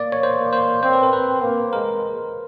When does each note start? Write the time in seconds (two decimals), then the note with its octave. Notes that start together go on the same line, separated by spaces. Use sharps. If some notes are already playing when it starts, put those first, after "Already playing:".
Already playing: A#3 D5
0.12 C#5
0.23 C5
0.38 A#3
0.53 C5
0.83 C4 C5
0.93 B4
1.03 A#4
1.13 C4 B4
1.43 A#3
1.73 G#3 A#4